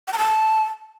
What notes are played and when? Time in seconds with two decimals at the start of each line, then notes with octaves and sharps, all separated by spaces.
0.08 G5
0.13 A#5
0.18 A5